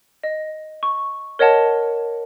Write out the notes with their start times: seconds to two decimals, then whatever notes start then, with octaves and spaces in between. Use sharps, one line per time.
0.23 D#5
0.83 C#6
1.39 A#4 C#5 D#5 F#5 A5